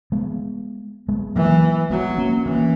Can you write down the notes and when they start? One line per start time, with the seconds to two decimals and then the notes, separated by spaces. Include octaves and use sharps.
0.12 G#3 B3
1.09 G#3 B3
1.35 E3 F#3 A#3
1.90 F#3 G#3 B3
2.18 A#3 C#4
2.45 E3 A#3 C#4